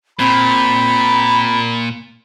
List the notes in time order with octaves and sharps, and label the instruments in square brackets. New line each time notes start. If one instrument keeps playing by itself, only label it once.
[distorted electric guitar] A#2 [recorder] C4 [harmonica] B5